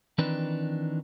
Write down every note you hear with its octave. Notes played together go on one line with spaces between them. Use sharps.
D#3 E3 C4 D4 D#4 B4